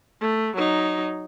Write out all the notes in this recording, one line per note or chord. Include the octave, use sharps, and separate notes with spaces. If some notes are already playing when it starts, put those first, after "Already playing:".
A3
F#3 D#4